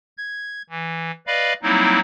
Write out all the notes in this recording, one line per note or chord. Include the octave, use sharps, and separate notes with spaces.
G#6
E3
B4 D5 D#5 F5 B5
F#3 G3 A#3 C4 D#4 E4